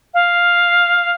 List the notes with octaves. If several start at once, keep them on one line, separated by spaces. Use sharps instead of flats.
F5